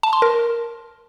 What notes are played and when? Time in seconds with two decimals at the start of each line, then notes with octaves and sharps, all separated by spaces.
0.03 A5
0.13 C6
0.22 A#4